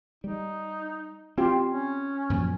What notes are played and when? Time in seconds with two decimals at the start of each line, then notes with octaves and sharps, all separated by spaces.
0.24 G3 D#4
1.38 C4 F4 G4
1.68 C#4
2.30 F#2 A#2 F3